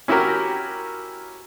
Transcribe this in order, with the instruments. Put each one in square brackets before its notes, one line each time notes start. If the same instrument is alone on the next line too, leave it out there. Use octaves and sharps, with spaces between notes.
[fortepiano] C#4 E4 F#4 G4 A#4